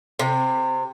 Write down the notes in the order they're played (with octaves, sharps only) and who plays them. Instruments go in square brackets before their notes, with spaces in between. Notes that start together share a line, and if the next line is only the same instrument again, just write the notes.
[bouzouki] C3